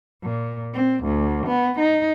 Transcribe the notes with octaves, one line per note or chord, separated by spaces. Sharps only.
A#2
C4
D2
B3
D#4